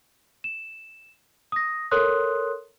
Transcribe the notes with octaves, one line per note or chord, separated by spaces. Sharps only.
E7
D#6 A#6
A4 A#4 C#5 C6 D#6 F#6